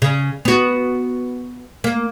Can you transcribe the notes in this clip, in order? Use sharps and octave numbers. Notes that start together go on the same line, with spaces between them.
C#3
B3 F#4
A#3